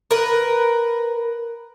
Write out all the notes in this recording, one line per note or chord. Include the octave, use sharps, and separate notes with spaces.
A#4 B4